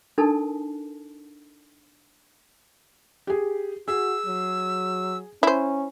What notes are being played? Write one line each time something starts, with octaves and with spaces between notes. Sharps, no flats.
D4 D#4 A4 A#4 G#5 A5
G4 G#4
F#4 G#4 E6
F#3
C#4 E4 C5